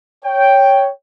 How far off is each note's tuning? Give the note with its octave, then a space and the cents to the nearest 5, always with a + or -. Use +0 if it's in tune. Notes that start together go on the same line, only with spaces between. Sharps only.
C#5 +0 G5 +0